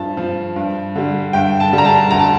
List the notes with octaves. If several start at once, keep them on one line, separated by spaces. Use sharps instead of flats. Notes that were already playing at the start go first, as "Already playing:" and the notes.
Already playing: G2 F3 A5
F3
G2
D3 G3
G2 G5
A5
D3 G3
A#5
A5
D2 A#5
A5